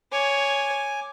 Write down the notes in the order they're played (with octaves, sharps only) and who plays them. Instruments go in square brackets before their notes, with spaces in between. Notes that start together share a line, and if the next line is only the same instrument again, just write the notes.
[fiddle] C#5 [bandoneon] G#5 D6